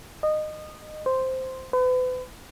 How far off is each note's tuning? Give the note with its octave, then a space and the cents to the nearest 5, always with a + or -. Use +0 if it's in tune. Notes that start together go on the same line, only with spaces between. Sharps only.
D#5 -20
C5 -5
B4 +40